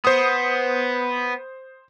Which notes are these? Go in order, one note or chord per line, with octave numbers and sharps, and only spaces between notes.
B3 C5 D#6